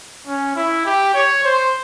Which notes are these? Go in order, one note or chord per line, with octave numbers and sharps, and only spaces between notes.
C#4
E4
G4
C#5
C5